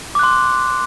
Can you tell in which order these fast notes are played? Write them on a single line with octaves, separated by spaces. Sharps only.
D6 F#6 C6